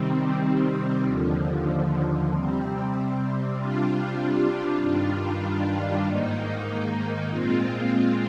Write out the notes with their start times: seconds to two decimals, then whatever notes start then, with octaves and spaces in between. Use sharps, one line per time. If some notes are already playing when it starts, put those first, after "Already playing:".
Already playing: C3 D#3 G3 C4
1.04 D#2 D3 F3
2.29 C3 G3 C4
3.54 C3 G3 D4 F4
4.79 G2 D#3 G3 D4 F4
6.04 G#2 D#3 A#3 D#4
7.28 A#2 G#3 C4 F4